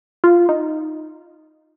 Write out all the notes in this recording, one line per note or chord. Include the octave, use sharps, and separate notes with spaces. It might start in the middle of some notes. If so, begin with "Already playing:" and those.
F4
D#4